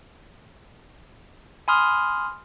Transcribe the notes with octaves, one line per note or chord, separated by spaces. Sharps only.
G#5 B5 C6 D#6 F6